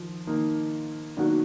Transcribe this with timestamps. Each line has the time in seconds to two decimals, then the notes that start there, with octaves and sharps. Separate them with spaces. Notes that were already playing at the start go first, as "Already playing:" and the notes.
Already playing: D#3 F3 F4
0.27 D#3 A#3 D#4
1.17 B2 D#3 F#3 A#3 D4 F#4